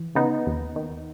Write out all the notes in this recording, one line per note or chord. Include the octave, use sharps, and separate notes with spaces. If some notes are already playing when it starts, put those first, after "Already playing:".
Already playing: E3
C#3 B3 D#4
D#2
D#3